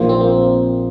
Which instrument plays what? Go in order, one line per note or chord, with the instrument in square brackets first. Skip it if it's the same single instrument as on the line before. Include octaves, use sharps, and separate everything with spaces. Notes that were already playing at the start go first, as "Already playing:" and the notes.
Already playing: [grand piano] A#1 A#2 F3 D#4 C5 [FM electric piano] A#3
[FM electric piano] C4
A#3